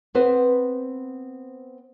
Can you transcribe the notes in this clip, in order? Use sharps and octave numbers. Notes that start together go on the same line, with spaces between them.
B3 C4 B4 C5